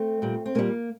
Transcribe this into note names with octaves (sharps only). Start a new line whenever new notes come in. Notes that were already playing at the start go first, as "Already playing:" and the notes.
Already playing: A3 C4
A#2 G3
C4
A#2 G3 A#3